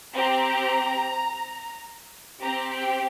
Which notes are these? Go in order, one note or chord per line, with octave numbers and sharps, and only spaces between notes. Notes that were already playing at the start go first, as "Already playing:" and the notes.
C4 G4 A#5
C4 G4 A#5
G5